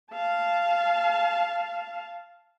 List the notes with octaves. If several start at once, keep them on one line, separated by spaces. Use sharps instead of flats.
F5 A5